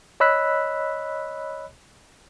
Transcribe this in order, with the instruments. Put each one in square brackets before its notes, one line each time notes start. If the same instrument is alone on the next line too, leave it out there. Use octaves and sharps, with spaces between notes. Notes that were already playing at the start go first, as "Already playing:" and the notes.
[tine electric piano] C#5 D#5 B5 E6 F#6 B6